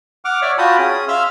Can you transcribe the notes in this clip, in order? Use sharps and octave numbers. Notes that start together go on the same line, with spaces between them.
F#5 D6 F6
C#5 D5 E5
F4 F#4 G5 A5 B5 D#6
C#4 G#4 D#6
E5 F5 C6 E6 F6